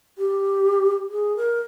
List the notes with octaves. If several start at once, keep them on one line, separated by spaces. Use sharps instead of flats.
G4
G#4
A#4